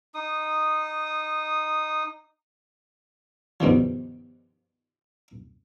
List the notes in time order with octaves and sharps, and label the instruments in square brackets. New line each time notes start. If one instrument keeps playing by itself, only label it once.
[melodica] D#4 D#6
[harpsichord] G2 B2 D#3 F3